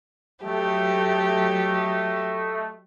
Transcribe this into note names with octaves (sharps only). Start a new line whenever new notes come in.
F#3 A3 G4 D#5